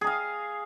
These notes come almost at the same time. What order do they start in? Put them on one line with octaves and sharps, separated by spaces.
G#4 A#5 F5